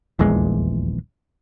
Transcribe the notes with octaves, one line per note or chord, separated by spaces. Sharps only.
D#1 A#1 E2 G#3